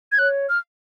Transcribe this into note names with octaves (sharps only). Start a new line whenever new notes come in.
G#6
C#5 F#6
F6